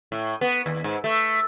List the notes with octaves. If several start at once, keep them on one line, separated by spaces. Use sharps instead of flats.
A2
B3
D#2
G#2
A3